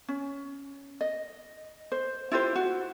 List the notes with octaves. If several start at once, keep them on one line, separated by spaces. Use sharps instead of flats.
C#4
D#5
C5
E4 F4 G4 C5
F#4